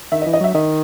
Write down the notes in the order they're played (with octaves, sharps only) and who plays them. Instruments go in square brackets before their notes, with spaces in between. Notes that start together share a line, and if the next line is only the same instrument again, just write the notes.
[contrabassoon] D#3 [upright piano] E5
[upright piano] D#5
[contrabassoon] E3
[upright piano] D#5
[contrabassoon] F#3 [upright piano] E5
[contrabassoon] D#3 [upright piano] D#5